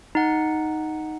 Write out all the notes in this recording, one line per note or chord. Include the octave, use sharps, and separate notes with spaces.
D#4 F#5